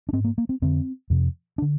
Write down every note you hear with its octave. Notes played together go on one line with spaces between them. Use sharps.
D4
G#2 C4
A#3
A#3
C4
F2 D3 C4
F2 C3
D4
D3